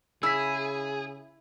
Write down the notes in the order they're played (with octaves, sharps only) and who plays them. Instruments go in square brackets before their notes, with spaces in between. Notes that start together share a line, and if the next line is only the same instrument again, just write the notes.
[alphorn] C#3 [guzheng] E4 [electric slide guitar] G#4 [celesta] E6 B6